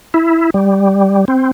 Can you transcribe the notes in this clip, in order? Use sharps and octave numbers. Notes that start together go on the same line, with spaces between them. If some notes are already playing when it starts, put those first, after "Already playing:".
E4
G3
C4